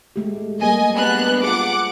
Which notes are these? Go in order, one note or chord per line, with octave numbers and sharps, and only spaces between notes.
G#3 A3 G4
G3 A#3 G#4 D#5 G#5
B3 D4 F#6
F4 G#4 F#5 D6